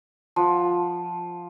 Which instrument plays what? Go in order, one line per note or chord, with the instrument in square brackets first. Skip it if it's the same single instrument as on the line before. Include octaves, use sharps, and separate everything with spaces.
[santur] F3 F#5